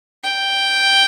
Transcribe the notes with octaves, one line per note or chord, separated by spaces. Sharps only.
G5